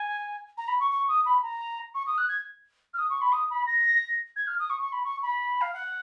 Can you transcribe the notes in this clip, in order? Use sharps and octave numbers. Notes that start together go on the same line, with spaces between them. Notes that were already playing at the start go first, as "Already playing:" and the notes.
Already playing: G#5
A#5
B5
C#6
C#6
D#6
B5
A#5
C#6
D#6
F#6
G#6
F6
D#6
C#6
B5
D#6
B5
A#6
G#6
F6
D#6
C#6
C#6
B5
C#6
B5
F5
F#5